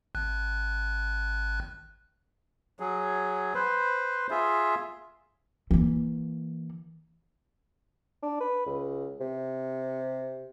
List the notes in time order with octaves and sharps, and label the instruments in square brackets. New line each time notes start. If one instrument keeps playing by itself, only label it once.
[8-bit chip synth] G#1 F#6
[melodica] F#3 G#4
B4 C5
F4 G#4 E5
[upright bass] E3 A#3
[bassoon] D4
B4
C#2
C3